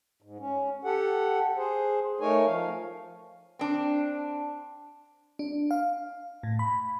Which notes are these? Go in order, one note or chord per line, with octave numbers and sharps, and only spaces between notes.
G#2
C#4
G4 A4 F#5
G#4 C5
A3 D#4 A#4 C#5 G#5
F3 F5
C4 D4
D4
F5
A2
B5